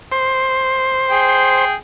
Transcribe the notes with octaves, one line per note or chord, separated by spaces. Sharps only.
C5
G#4 G5